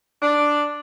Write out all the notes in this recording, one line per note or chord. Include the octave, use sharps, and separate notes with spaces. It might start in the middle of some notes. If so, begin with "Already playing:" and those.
D4